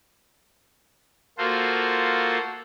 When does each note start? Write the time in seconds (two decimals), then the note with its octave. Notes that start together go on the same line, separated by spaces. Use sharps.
1.38 A#3 F4 F#4 A4 C5